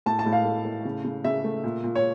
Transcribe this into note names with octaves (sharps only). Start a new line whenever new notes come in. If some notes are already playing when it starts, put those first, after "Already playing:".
A2 A5
A5
A2
F5
A3
A2
C#3
C#3
C#3 E5
A3
A#2
A#2
C#5